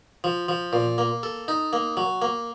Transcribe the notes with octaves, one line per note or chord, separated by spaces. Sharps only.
F3
F3
A#2
A#3
A4
D#4
A#3
F#3
A#3